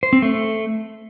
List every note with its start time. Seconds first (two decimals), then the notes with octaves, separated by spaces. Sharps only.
0.03 C5
0.13 C4
0.22 A3